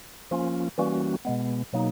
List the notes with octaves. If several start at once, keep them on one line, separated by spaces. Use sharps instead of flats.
F3 A#3 C#4 F4
E3 G3 A#3 C#4 F#4
B2 G#3 B3
B2 F#3 A#3 D#4